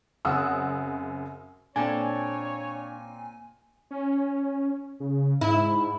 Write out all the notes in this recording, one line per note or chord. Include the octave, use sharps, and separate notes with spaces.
F#2 C#3 C4 F#5 D#6 E6
A#2 C4 D4 A4 C#5 G#5
C#4
C#3
G#2 E4